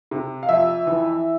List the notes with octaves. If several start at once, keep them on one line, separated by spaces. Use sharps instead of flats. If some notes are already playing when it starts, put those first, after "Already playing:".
C3
F5
F2 E5
E3